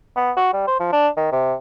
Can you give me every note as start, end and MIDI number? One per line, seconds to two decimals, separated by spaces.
0.16 0.32 59
0.37 0.50 66
0.53 0.66 55
0.67 0.76 72
0.80 0.92 53
0.93 1.08 62
1.17 1.29 51
1.32 1.55 48